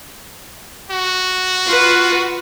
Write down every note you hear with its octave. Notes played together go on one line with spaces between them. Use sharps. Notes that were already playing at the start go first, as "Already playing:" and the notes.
F#4
F4 B4